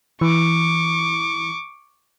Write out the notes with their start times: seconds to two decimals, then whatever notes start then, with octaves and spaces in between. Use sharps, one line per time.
0.21 E3 C#6 D6